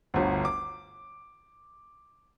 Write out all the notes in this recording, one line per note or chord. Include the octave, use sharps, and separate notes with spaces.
G1 D2
D6